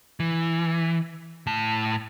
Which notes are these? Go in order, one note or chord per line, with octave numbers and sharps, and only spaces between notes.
E3
A2 A5